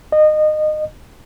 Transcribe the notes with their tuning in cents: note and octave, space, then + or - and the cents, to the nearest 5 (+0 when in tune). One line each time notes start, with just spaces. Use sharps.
D#5 -25